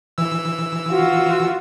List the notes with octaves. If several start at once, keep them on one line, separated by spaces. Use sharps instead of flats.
E3 E6
F4 F#4